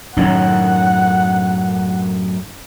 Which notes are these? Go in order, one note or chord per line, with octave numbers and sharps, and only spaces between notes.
F#2 A2 D#3 C#4 D#4 F#5